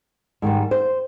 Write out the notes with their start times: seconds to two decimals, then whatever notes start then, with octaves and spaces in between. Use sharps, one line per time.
0.42 G#2 D#3 G3
0.71 C5